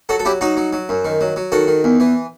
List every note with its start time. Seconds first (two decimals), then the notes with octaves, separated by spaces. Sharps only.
0.09 F#3 F#4 A4
0.19 A4
0.25 F#3 E4 G4
0.41 F#3 D#4 F#4
0.57 F#3
0.73 F#3
0.89 F#2
1.05 D#3
1.21 F#3
1.36 F#3
1.52 D#3 F#4 A4
1.68 D#3
1.84 E2
2.00 E3